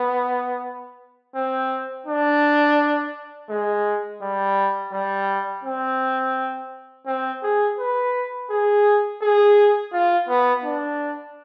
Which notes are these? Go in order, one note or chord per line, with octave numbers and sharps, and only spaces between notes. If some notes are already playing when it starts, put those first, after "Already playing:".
Already playing: B3
C4
D4
G#3
G3
G3
C4
C4
G#4
B4
G#4
G#4
F4
B3
D4